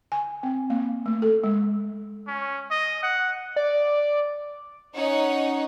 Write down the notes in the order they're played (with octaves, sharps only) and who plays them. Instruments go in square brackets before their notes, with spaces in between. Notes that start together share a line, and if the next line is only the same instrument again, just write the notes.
[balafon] G#5
C4
A#3
A3
A4
G#3
[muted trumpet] C#4
D#5
F#5
[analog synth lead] D5
[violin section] C#4 D#4 C#5 F#5